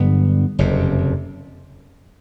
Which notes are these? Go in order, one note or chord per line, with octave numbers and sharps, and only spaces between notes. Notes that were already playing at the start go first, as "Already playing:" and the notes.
Already playing: G2 D3 F#3 B3
F#1 F2 C3